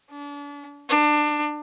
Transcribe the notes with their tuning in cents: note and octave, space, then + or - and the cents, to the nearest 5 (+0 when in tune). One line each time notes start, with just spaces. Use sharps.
D4 -35
D4 +25